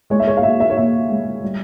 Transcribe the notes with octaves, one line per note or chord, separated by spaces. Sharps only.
G#3 C#5
E5
C#5
F5
A#2 E5
E5
C#5
A#2 E5
G#3
G3